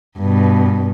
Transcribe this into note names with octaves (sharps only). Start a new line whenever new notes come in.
G2 B2